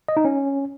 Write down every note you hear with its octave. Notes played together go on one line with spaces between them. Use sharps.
D#5
D#4
C#4